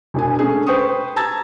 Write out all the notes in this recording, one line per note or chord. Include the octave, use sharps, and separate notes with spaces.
E1 D4 G#5
A3 C#4 D4 G#4
B4 C5 G5 C#6 D#6
A5 A#5 E6 G#6 A6